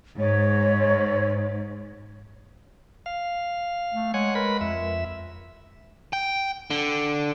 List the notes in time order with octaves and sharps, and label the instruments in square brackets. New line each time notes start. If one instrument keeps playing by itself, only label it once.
[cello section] G#2 [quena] C#5
[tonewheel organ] F5
[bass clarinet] A3
[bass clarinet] G#3 [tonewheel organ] C#5 F#5 G#5
[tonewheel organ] A#4 B4 B5
F2 E5
[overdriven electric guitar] G5
D3